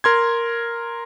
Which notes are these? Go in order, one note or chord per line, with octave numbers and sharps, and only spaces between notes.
A#4 C6 G#6